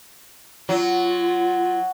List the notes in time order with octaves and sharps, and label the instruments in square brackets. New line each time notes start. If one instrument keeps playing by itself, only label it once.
[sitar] F#3 [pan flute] F4